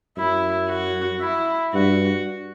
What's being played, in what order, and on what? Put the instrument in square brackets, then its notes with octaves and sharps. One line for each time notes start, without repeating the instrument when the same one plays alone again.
[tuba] F#2 [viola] E4
[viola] F#4
E4
[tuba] G2 [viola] F#4